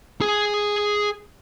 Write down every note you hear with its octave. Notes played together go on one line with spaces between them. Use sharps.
G#4 G#5